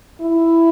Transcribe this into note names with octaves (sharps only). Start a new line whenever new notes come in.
E4